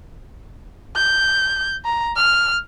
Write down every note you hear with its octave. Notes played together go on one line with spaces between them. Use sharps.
G6
A#5
F6